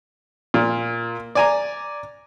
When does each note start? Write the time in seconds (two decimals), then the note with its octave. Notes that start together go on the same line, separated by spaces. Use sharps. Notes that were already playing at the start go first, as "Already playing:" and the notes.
0.54 A#2 F4
1.35 D5 G#5 A#5